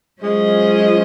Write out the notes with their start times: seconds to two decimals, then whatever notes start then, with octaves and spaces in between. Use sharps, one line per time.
0.22 F#3 G#3 C#4 F4 C5 D#5